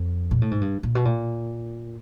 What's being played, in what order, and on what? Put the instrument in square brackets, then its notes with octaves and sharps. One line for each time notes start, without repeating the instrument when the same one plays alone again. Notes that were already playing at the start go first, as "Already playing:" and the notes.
Already playing: [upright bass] F2
A#2
A2
G#2
G2
A#2
B2
A#2